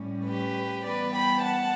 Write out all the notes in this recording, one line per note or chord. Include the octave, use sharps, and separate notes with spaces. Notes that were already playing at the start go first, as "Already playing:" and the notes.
Already playing: A2 G3 C#4
G4 B4
E3 G3 B3 B4 D5
G5 B5
F#5 A5